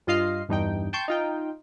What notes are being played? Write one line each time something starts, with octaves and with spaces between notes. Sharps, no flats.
G2 F4 D#5 F5 C7
E2 G2 D#4 G5
G5 A5 C6 C#6 G6
D#4 F4 G5